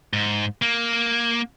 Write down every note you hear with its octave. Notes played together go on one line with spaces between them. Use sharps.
G#2
A#3